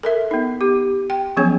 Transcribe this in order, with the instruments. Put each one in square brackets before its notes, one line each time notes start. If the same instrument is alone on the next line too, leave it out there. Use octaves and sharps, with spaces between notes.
[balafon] A4 A#4 E5
B3 D#4
B3 G4
G5
F3 F#3 B3 C#4 G#4 C#5